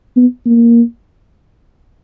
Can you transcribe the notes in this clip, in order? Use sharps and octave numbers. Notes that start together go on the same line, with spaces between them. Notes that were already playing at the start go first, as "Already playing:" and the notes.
B3
A#3